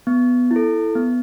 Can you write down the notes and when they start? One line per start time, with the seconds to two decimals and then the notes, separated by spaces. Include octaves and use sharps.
0.07 B3
0.51 E4
0.56 A4
0.95 B3